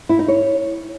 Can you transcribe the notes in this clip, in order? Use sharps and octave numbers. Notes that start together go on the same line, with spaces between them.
E4
D#4
C#5